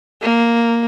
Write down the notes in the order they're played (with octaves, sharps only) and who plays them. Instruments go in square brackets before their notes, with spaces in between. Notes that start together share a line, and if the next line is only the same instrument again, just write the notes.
[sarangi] A#3